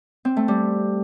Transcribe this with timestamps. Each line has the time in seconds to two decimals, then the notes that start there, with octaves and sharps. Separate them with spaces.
0.25 C4
0.37 A3
0.48 G3